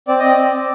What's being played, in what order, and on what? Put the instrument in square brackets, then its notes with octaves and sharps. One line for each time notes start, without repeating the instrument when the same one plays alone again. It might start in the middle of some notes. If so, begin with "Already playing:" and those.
[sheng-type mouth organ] C4 D5
C4 D#5
D5
C4
C4